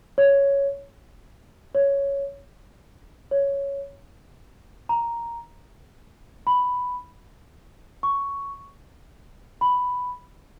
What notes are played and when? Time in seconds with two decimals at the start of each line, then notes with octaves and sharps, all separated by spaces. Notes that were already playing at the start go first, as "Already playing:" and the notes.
0.18 C#5
1.75 C#5
3.31 C#5
4.89 A#5
6.47 B5
8.03 C#6
9.61 B5